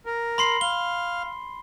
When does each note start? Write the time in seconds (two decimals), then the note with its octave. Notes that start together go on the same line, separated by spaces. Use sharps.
0.06 A#4
0.38 B5 C6 C7
0.61 F5 G7